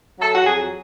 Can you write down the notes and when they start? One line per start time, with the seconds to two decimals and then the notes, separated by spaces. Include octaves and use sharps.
0.20 F#3 A4
0.35 F#4
0.45 F2 G#4